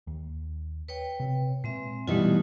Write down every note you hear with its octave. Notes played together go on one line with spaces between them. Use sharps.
D#2
B4 C#5 G5
C3 C4
A#2 G#3 C4 E5
B2 E3 G3 A3 D#4 F4